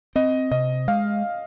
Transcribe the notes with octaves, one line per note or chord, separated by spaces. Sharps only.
C4 D#5
C3 D#5
G#3 F5